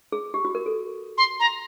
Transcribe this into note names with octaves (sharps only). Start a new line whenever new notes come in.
G#4
G4
F#4
A#4
A4
C6
A#5